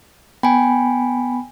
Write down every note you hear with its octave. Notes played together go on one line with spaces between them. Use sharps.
B3 G5 G#5 B5